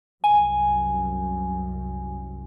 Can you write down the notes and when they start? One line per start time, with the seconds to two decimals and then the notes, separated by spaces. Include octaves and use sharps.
0.24 C2 F#2 G#5